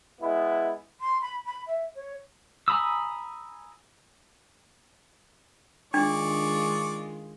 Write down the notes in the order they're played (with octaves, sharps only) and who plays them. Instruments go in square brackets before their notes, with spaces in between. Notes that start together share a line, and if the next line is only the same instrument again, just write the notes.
[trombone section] G#3 B3 E4
[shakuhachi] C6
B5
B5
E5
C#5
[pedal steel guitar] G#5 A#5 B5 D#6 E6
[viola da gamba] D#3 G#3 F4 [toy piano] D4 [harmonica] D5 C#6